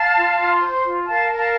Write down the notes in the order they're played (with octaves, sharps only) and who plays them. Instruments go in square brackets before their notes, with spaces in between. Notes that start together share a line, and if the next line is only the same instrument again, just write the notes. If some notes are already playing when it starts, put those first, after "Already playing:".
Already playing: [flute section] F5 A5
F4
F4
C5
F4
A#4 F5 A5
A#4
F5 A5